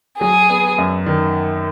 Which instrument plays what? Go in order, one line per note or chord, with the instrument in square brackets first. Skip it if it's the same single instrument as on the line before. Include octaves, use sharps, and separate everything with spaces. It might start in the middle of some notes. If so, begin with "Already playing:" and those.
[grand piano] F#3 [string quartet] G#4
[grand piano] B3
F#2
D#3